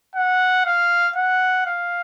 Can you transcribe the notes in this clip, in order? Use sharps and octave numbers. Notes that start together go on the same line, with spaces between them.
F#5
F5
F#5
F5